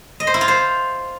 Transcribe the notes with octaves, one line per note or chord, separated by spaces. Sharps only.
D#5
C5
E4
F4
C5